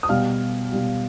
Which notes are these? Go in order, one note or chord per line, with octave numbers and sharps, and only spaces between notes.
D#6
B2 G3 F5 F6
B2 G3